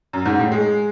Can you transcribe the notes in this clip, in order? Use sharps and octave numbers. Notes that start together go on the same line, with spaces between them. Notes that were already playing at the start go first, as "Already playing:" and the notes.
F#2
G#2
A2
G#3